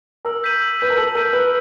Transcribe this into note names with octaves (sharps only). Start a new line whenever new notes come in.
A#4 E6
G6 B6 D#7 F#7
E6
B4 G6 B6 D#7 F#7
A#4
A4 E6
A#4 G6 B6 D#7 F#7
B4 E6